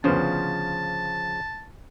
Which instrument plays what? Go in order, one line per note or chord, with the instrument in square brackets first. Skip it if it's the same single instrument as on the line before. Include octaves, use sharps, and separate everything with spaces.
[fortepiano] D2 B3 C#4 [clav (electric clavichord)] C#3 F3 C5 [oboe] A5